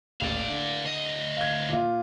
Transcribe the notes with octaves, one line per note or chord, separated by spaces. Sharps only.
D#1 A1 D5 F5
D3
D2 D#5
F5 G#6
A#2 F4